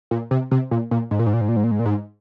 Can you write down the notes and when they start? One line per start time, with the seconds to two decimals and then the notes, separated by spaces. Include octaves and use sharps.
0.11 A#2
0.31 C3
0.51 C3
0.71 A#2
0.91 A#2
1.11 G#2
1.19 A#2
1.26 G#2
1.33 A#2
1.41 G#2
1.48 A#2
1.56 G#2
1.64 A#2
1.71 G#2
1.79 A#2
1.86 G#2